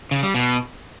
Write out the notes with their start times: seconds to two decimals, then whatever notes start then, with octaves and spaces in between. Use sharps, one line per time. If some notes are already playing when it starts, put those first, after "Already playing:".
0.11 C#3
0.23 G3
0.35 B2